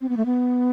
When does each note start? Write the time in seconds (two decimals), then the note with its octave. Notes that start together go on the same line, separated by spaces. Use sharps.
0.01 C4
0.09 B3
0.17 A3
0.26 B3